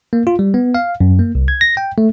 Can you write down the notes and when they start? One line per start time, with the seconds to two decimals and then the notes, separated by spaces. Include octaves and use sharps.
0.13 A#3
0.27 F4
0.39 G3
0.54 B3
0.75 F5
1.01 F#2
1.19 A#3
1.35 C2
1.48 G#6
1.61 A#6
1.77 G5
1.98 A3